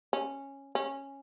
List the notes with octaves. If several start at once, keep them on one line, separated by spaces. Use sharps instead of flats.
C#4
C#4